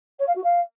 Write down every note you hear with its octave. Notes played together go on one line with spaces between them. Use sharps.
C#5
F5
F#4
F5